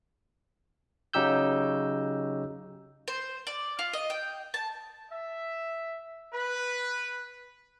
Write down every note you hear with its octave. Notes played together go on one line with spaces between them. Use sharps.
C#3 F#3 D#4 G4 E6 G6
C5
D5
F4
D#5
G5
A5
E5
B4